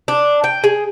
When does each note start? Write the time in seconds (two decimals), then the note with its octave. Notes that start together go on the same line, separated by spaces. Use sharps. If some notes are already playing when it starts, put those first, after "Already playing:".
0.08 D4
0.44 G5
0.64 G#4